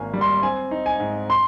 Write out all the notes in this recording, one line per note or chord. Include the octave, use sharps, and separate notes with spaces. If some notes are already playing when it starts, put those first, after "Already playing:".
Already playing: G#1 A#3 G#5
G3
C6
C4 G#5
D#4
G#5
G#2
C6